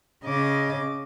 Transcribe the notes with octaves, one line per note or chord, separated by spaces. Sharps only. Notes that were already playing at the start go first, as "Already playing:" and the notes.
C#3 D#5 D6